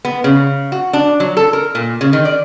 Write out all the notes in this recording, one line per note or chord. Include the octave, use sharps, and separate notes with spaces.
B3
C#3
F#4
D4
F#3
A4
A#4
A#2
C#3
D#3
D5